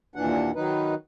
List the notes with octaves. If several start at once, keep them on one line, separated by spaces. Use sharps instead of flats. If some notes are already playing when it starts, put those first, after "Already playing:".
D#2 A#2 E3 D4 F#5
D#3 F#3 D#4 B4